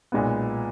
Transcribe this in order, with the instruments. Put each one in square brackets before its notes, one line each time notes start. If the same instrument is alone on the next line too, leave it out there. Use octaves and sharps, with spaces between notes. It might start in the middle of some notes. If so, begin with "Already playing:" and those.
[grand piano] B1 A#2 G#3 B3